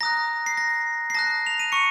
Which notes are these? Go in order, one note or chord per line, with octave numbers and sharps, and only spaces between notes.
A#5 D#6 F#6 A#6
C7
A#6
C7
A5 D#6 F#6 A#6
F7
D#7
C#6 C#7